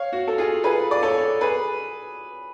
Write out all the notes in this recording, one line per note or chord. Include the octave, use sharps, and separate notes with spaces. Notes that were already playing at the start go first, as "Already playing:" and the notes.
Already playing: C#5 F5
F#4
A4
F4 G#4
G#4 B4
D5
A4 C#5
G#4 B4